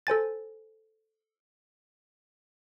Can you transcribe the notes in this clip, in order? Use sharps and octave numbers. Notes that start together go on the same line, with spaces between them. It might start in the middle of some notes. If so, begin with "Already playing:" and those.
A4 C5 G#5 A6